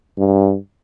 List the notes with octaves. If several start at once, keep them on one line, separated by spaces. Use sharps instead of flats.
G2